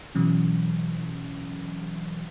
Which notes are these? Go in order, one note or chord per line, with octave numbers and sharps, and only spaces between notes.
B2 E3 F#3 C#4